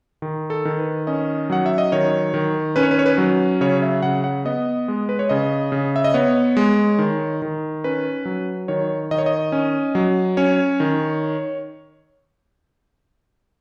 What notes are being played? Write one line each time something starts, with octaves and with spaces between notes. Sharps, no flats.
D#3
A4
D#3
B4
C#4 D#5
F#3 F#5
E5
D#5
D#3 C#5
D#3
C#4 B4
C#5
B4
C#5
B4
F#3
C#3 C#5
E5
C#3 F#5
F#5
B3 D#5
G#3
B4
C#5
C#3 D#5
C#3
E5
D#5
B3 C#5
G#3
D#3
D#3
C#4 B4
F#3
D#3 C#5
D#3 D#5
C#5
D#5
C#4
F#3
C#4 C#5
D#3